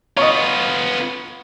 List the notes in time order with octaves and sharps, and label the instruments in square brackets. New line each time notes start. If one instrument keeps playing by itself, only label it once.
[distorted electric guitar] B3 F4 [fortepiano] C#5 D#5